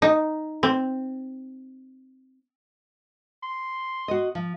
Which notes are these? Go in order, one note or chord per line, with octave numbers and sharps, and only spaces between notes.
D#4
C4
C6
F#4 D#5
F3